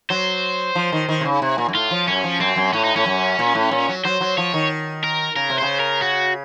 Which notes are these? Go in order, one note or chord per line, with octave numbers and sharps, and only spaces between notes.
F#3 C5
F3
D#3
D#3
C3
C#3
C3
A#2
F#2
A2 F4
F3
F#2 C#4
F3
F#2 C4
F#2
A2 C#4
D#4
A2 C#4
F#2
A#2
A2
A#2
F#3
F#3 C5
F#3
F3 C#5
D#3
A#4
C#3 A#4
C3
C#3 C5
A#4
F#4